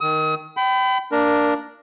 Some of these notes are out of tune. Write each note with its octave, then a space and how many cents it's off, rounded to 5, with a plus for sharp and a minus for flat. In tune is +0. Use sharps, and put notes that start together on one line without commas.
D#3 +0 D#6 +40
G5 -25 B5 +30
A#3 -20 D4 +0 A#4 +5